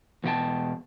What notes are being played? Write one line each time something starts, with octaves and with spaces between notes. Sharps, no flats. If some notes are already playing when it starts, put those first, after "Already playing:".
E2 B2 D#4 G5 A5